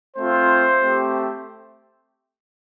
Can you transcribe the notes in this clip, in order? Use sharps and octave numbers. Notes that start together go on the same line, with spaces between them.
A3 C4 F4 C5
A3 C4 G4